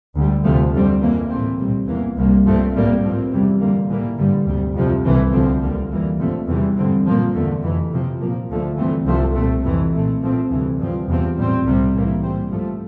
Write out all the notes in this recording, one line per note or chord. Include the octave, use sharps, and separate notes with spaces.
D2 D3 G3
D2 C3 F3 A3
F2 D3 G3 C4
F2 E3 A#3
A2 E3 A3 C4
C2 A#2 G3 C4
E2 E3 A#3
C2 C3 G3 A#3
G2 F3 A3 C4
A2 G3 A#3
G2 F3 C4
E2 C3 E3 G3
F2 D3 G3 A#3
A2 E3 G3 A#3
G2 D3 G3
D2 C3 G3
F2 C3 F3
C2 C3 E3 A3 C4
D2 D3 F3 C4
D2 D3 G3 A#3
F2 E3 G3 A#3
G2 D3 F3 A3 C4
E2 C3 E3 G3
G2 D3 G3 C4
A#2 F3 A#3
E2 D3 A3
F2 C3 E3
F2 C3 F3 C4
A#2 F3 A#3
D2 D3 F3 A3
G2 E3 A3 C4
C2 C3 F3 A3 C4
A#2 A3 C4
F2 C3 E3
A#2 A3 C4
A#2 F3 A3 C4
D2 C3 E3 G3
G2 F3 C4
E2 C3 F3 C4
A2 G3 C4
C2 C3 G3
A2 E3 A#3
A#2 G3 C4
G2 F3 A3